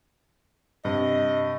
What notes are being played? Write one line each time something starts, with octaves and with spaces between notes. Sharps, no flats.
G2 C3 D#5